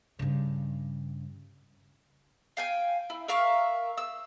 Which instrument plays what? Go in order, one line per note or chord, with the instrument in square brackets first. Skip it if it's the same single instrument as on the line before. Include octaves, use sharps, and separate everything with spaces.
[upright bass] G2 C#3
[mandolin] F5 G5 G#5
E4
A#4 E5 F5 C#6
E6